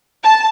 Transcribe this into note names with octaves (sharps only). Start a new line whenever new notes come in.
A5